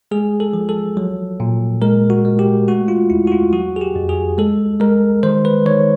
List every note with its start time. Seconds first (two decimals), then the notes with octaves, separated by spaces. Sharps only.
0.11 G#3 G#4
0.40 A4
0.53 F3
0.69 A4
0.97 F#3
1.40 A#2
1.82 G#3 A#4
2.10 F#4
2.25 G#3
2.39 G4
2.68 A3 F#4
2.88 F4
3.10 E2 E4
3.27 F#4
3.32 F4
3.53 F#3 F#4
3.76 G#4
3.81 G4
3.96 F2
4.09 G#4
4.38 G#3 A4
4.80 G#3 A#4
5.23 D#3 C5
5.45 B4
5.66 D#3 C#5